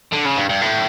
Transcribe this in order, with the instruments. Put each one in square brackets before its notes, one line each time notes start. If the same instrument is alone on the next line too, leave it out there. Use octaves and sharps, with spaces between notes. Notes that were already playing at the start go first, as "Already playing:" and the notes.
[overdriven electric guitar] D3
C#3
G2
G2
A2